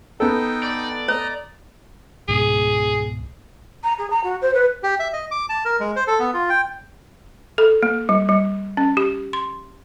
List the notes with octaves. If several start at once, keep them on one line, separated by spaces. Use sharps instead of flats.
B3 D#4 A4 G5
D5
C#5 D#5 A#5
C#2 G#2 B2 G#4
A#5
G#4
A#5
F#4
C5
B4
G4
E5
D#5
D6
A5
A#4
G#3
C5
A4
B3
F4
G5
A4
A#3
G3
G3
C#4
G4
C6